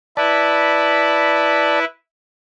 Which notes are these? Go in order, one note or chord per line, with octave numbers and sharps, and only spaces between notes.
E4 B4 D5 A5